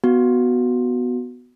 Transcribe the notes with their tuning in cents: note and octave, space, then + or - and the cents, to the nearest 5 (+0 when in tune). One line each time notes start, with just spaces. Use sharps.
B3 +0 F#4 +0